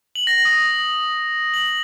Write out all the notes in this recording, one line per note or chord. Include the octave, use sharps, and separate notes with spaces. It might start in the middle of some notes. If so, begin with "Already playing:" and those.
F#7
A#6
D#6
F#7